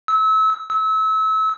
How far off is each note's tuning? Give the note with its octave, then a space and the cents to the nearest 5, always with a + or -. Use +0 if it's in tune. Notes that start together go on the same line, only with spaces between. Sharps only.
E6 -30
E6 -30